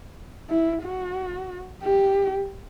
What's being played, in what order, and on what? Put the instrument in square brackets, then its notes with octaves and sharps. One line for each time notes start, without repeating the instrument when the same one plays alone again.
[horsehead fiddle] E4
F#4
G4